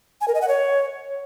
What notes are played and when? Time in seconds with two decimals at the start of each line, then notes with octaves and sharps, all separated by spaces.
0.21 G#5
0.28 A#4
0.35 D#5
0.41 F#5
0.48 C#5